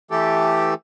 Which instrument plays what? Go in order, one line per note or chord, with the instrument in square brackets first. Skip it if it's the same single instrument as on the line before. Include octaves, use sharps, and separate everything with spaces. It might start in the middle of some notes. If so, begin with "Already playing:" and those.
[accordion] E3 A3 G4 A4